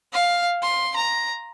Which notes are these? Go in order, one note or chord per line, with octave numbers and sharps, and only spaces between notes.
F5
C6
A#5